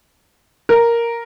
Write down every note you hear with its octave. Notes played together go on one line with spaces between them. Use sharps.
A#4